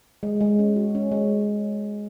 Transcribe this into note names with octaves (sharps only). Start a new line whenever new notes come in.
G#3
G#3
C#4
F#4
C#4
G#3